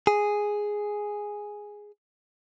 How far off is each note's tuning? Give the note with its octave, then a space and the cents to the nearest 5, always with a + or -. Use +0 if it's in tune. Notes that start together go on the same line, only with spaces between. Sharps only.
G#4 +0